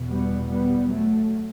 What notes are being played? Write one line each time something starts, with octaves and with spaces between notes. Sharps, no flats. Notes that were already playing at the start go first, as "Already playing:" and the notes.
Already playing: E2 B2
G3 B3
G3 B3
F#3 A3